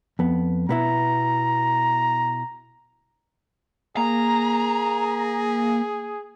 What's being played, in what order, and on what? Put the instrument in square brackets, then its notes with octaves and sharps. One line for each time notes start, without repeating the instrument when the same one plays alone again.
[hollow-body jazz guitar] F2 B3
[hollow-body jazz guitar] B2 B3 E4 [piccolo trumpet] A#5
[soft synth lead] A#3 [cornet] G#4 [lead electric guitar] A#5